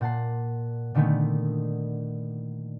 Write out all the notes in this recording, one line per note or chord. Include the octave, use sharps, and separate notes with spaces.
A#2 F#5 A5 C7
A#2 D3 D#3 A3 B3